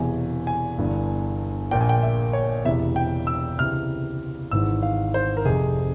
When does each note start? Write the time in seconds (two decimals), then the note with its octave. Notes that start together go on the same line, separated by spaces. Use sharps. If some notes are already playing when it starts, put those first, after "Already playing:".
Already playing: E1 E2 C3 E3 G#5
0.47 G#5
0.78 G1 G2 E3
1.71 A#1 A#2 G5
1.81 G#5
1.89 G5
2.03 E5
2.33 C#5
2.65 E1 E2 C3 E3 E5
2.96 G5
3.27 E6
3.58 C#2 C3 E3 F6
4.51 G#1 G#2 E3 E6
4.83 F5
5.14 C5
5.37 A#4
5.45 F1 F2 C3 G#4